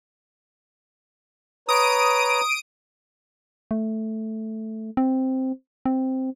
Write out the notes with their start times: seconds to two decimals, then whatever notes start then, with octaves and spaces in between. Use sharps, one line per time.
1.69 B4 C#5 A#5 D#6 D7
3.71 A3
4.97 C4
5.86 C4